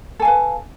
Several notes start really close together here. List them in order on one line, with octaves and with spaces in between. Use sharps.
A4 G#5 F5 B4